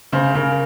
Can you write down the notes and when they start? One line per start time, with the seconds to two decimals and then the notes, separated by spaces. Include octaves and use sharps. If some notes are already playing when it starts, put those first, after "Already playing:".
0.12 C#3 C5
0.35 C#3 A#4